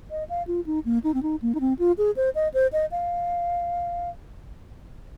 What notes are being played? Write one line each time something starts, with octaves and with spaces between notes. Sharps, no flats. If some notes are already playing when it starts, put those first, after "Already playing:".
D#5
F5
F4
D#4
A#3
D#4
C4
D#4
A#3
D#4
C4
F4
G#4
C5
D#5
C5
D#5
F5